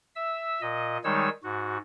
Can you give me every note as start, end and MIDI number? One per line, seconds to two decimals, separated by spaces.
0.15 0.61 76
0.15 0.61 88
0.61 0.98 46
0.61 0.98 75
1.04 1.29 51
1.04 1.29 55
1.04 1.29 56
1.04 1.29 63
1.04 1.29 73
1.04 1.29 88
1.44 1.77 44
1.44 1.77 66